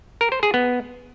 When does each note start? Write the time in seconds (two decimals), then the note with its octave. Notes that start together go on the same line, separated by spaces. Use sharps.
0.21 A#4
0.32 C5
0.43 G#4
0.54 B3